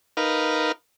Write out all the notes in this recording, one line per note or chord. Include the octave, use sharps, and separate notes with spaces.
D#4 A#4 B4 F5